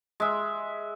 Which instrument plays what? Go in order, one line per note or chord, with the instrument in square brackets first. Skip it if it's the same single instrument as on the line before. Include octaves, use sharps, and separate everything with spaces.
[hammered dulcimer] G#3 E5